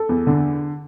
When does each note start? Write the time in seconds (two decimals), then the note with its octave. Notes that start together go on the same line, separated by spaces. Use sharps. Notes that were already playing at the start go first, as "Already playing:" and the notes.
Already playing: A4
0.09 E2
0.27 D3